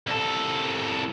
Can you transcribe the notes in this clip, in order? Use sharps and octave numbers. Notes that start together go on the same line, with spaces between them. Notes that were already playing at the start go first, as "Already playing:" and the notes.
C2 A4